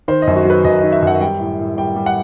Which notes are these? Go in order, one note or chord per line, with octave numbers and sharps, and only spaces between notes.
D#3 C5
D#5
F#2
F#4
F#3 B4
F#2 D#5
D#3 D#5
E5
F#2 F#5
G3 G5
A2
A2
G3 G5
G3
F#5